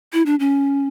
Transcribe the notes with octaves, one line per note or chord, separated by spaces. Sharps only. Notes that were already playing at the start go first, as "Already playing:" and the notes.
E4
D4
C#4